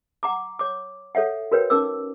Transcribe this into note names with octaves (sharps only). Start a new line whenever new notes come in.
F#5 A#5 D6
C#5 D6
A4 C#5 E5 F#5
F#4 A#4 B4 C#5 G5
C#4 D#4 A#4 D6 E6